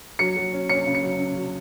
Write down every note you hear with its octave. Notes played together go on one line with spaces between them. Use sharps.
F#3 C#7
F#3
C#4
C#4 C#7
C#3
C#7
F#3
C#3
F#3